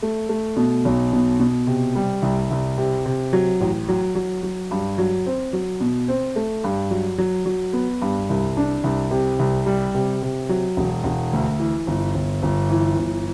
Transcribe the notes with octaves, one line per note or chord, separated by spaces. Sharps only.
A3
A3
B2
B1
B2
B2
C3
G3
C2
C2
C3
C3
F#3
A1
F#3
F#3
F#3
G2
F#3
C4
F#3
B2
C4
A3
G2
F#3
F#3
F#3
B3
G2
C2
D4
C2
C3
C2
G3
C3
C3
F#3
E1
E1
D2
E3
G1
G1
G1
E3
G1